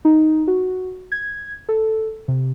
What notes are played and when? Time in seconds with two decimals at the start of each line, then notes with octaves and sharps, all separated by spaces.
0.05 D#4
0.47 F#4
1.12 G#6
1.69 A4
2.28 C3